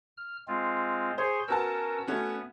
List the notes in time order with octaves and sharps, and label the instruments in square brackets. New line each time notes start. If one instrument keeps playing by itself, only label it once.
[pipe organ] F6
G#3 C4 F4
[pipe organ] G#4 C#5 C6 [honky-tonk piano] C5
[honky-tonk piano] B3 F#4 A5 [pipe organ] C#4 A#4 E6
[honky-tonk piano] A3 C#4 F#4 [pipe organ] B3